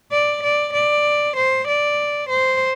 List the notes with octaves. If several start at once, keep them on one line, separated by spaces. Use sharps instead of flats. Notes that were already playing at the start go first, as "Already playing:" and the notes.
D5
D5
D5
C5
D5
C5